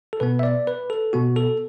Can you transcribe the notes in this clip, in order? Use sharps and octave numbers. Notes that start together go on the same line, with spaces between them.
A4
B2 B3 B4
E5
D5
B4
A4
B2 B3 F#4
A4